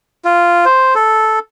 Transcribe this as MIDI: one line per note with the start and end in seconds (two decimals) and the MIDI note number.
0.25 0.65 65
0.65 0.94 72
0.95 1.39 69